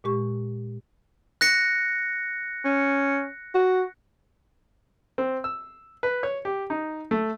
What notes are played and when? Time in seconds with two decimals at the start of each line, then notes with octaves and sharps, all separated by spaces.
0.04 A#2 G#3 G4 C#6
1.41 F#6 A#6 C#7
2.65 C#4
3.55 F#4
5.18 C4
5.44 E6
6.03 B4
6.23 C#5
6.45 G4
6.70 D#4
7.11 A3